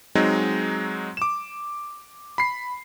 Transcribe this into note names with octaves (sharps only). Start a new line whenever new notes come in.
F#3 G#3 C4 D#4
D6 E7
B5 C7